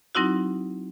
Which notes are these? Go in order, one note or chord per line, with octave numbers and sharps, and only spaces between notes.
F#3 C4 D#4 E4 F#4